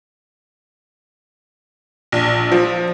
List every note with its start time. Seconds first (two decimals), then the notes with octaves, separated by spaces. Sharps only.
2.12 A#1
2.52 F3